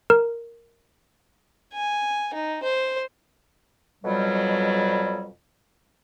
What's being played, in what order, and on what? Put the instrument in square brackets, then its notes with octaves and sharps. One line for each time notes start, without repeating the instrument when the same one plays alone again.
[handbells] A#4
[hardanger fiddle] G#5
D#4
C5
[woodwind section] F2 B2 F#3 G3